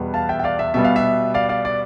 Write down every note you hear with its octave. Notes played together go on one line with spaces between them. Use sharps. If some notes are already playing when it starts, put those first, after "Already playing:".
Already playing: E2 B2 G3 B3
F5 A5
E5 G5
G5
D5 F5
E5
B2 G3 B3 E5
F5
E5
D5 F5
D5 F5
D5